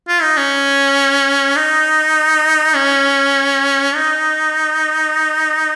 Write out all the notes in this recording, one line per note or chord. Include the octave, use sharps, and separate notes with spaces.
F4
D#4
C#4
D#4
C#4
D#4